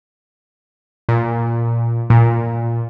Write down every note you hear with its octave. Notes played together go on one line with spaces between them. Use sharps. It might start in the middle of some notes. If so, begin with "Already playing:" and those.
A#2
A#2